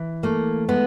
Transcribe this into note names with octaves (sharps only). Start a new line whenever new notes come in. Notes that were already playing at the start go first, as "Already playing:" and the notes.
Already playing: E3
A3 A#3
G#3 B3